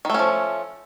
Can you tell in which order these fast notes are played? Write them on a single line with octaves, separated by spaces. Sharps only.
D#3 A3 C#4 F3